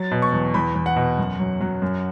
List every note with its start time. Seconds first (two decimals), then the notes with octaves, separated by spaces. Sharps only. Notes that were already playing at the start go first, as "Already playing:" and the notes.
Already playing: F#3 A6
0.11 B2
0.22 C#6
0.32 E2
0.54 E2 B5
0.75 E2
0.86 F#5
0.96 B2
1.18 F#2
1.39 F#3
1.61 F#3
1.82 F#2